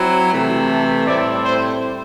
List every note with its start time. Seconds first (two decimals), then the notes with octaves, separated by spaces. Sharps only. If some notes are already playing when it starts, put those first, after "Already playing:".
Already playing: F#3 C4 E4
0.31 C3 E3 A3
0.69 A4
1.06 A2 G3 C4 E4 D5
1.44 C5